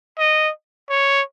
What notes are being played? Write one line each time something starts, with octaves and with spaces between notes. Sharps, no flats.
D#5
C#5